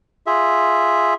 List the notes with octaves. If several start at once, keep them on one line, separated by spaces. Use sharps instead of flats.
F4 G#4 E5